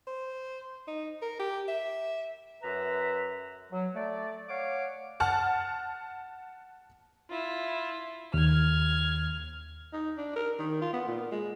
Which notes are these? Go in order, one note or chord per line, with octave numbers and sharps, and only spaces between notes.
C5
D#4
A#4
G4
E5
F#2 B4 E5 A#5
F#3
A3 D5
C#5 D5 F5 F#5 D6
F#5 A5 F6
E4 F4
D#2 F6 G#6
D#4
D4
A#4
D#3
F4
B3
A#2
G#3